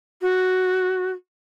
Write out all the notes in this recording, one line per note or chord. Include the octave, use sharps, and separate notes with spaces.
F#4